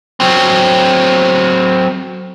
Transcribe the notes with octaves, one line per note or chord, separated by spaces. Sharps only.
F#3 C4